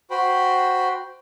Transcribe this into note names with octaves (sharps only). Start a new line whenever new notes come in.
F#4 C5 G5 B5